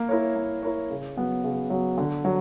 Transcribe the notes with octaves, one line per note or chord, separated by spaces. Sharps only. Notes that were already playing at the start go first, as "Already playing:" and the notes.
Already playing: A#3
E4 A#4 C#5
A#3
E4 A#4 C#5
C#3
F#3 B3
C#3
F#3 B3
D3
F#3